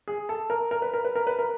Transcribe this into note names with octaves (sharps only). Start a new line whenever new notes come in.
G#4
A4
A#4
A#4
B4
A#4
B4
A#4
B4
A#4